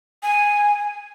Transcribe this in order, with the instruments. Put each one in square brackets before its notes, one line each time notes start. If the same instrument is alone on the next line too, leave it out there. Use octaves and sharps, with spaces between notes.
[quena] G#5